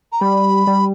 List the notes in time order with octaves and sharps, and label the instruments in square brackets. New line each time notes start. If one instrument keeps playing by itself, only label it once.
[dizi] A#5
[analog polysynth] G3 [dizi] B5
[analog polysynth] G3